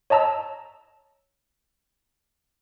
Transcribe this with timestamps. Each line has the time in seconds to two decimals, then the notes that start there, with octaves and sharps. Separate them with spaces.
0.10 C#5 D#5 A5 A#5 E6